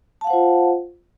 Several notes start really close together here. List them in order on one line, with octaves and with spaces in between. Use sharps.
A5 F5 F#5 C5 F4